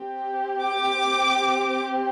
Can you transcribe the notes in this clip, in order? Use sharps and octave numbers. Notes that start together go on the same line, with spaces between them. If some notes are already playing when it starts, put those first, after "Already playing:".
Already playing: C4 G4
D6